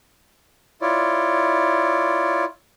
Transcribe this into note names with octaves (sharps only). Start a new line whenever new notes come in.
E4 F4 C#5 D5